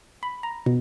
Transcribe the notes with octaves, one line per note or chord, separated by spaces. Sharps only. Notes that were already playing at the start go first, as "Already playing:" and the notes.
B5
A#5
B2